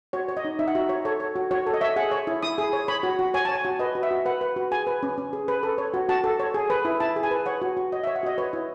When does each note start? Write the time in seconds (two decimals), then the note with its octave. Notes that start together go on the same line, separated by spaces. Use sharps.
0.13 F#4 C#5
0.29 C#5
0.37 D#5
0.45 D#4
0.59 D#4 E5
0.68 F#5
0.75 F#4 E5
0.89 C#5
1.05 A4 C#5
1.20 C#5
1.36 F#4
1.51 F#4 C#5
1.67 A4
1.74 D#5
1.81 C#5 E5
1.96 G#4 F#5
2.12 C#5
2.27 E4
2.43 E4 D#6
2.58 G#4
2.73 C#5
2.88 C#5 B5
3.03 F#4
3.19 F#4
3.34 C#5 G#5
3.45 C#5 A5
3.55 G#5
3.65 F#4
3.79 B4 D#5
3.95 F#4
4.03 E5
4.11 F#4
4.26 B4 F#5
4.41 B4
4.56 F#4
4.71 G#4 G#5
4.87 B4
5.03 C#4
5.18 C#4
5.33 G#4
5.48 B4
5.63 A4
5.78 C#5
5.94 F#4
6.09 F#4 A5
6.24 A4
6.40 C#5
6.54 G#4
6.70 B4
6.85 E4
7.00 E4 A5
7.16 G#4
7.23 G#5
7.31 B4
7.46 C#5 F#5
7.62 F#4
7.77 F#4
7.92 C#5 D#5
8.04 C#5 E5
8.16 F#5
8.23 F#4 D#5
8.38 B4 C#5
8.53 E4